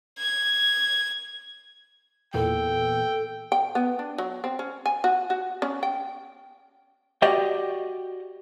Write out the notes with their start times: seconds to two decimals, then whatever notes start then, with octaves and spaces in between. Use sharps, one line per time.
0.19 G#6
2.34 E2 A#2 A4 G5
3.52 G5
3.75 B3
3.99 D4
4.18 F#3
4.44 C4
4.59 C#4
4.86 G#5
5.04 F#4
5.30 F#4
5.62 C#4
5.83 G5
7.22 F#4 G4 D5 D#5 G5